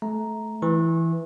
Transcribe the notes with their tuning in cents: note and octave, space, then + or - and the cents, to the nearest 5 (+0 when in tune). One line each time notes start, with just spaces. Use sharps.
A3 -20 A#5 +0
E3 +0 C#6 -35